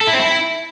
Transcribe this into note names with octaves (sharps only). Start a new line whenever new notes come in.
A4
E4
C4
E4